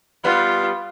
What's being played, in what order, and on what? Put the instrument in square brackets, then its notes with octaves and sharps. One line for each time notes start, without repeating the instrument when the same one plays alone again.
[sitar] G3 B3 [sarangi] F4